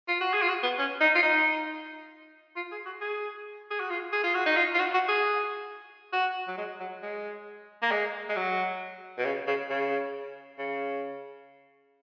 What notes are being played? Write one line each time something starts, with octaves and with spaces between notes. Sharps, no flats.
F4
F#4
G#4
F4
F#4
B3
C#4
D#4
F4
D#4
F4
G#4
F#4
G#4
G#4
F#4
F4
G#4
F4
F#4
D#4
F4
F4
F#4
F#4
G#4
F#4
F#3
G#3
F#3
G#3
A#3
G#3
G#3
F#3
B2
C#3
C#3
C#3
C#3